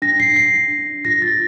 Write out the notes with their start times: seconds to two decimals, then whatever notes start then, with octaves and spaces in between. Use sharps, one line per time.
0.02 D4 A#6
0.20 C7
0.27 D4
0.36 C7
0.54 D4
0.79 D4
1.05 F4 A#6
1.22 A6
1.31 F4